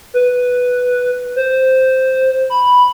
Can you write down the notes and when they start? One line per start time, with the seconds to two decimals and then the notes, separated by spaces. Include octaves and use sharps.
0.14 B4
1.36 C5
2.50 B5